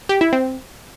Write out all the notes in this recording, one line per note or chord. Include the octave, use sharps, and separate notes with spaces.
G4
E4
C4